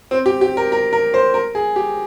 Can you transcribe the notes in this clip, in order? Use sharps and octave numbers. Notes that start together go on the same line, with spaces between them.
C4
G4
G4
A#4
A#4
A#4
C5
A#4
G#4
G4